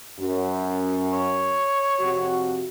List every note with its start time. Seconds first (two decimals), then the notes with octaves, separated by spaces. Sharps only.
0.19 F#2
1.13 C#5
2.00 F2 C3 F#4